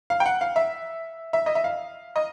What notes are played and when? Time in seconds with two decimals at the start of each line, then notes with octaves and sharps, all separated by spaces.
0.10 F5
0.20 G5
0.26 F#5
0.41 F5
0.56 E5
1.33 E5
1.46 D#5
1.55 E5
1.64 F5
2.16 D#5